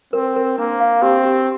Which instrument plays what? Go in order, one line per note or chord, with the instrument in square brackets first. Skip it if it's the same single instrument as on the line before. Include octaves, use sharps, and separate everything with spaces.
[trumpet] C4 [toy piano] A#4
[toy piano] A#4
[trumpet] A#3 [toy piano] D4
[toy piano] F5
[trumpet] C4 [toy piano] G4
[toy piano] G4